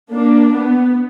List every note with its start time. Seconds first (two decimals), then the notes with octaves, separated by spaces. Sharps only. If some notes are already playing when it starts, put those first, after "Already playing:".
0.11 A#3 D4
0.53 B3